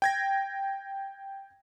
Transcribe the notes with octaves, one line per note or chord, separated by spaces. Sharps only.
G5 G#6 A#6